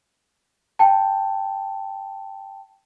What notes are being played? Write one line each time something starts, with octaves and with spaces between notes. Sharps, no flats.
G5 A5